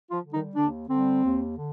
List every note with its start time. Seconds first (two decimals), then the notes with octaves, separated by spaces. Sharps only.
0.11 F3 F4
0.21 D3 G3
0.33 D#3 D#4
0.56 D#2 D3 D4
0.89 D3 G3 C4
1.24 D#2
1.58 D3